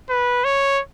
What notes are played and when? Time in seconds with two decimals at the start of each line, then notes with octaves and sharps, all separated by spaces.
0.09 B4
0.44 C#5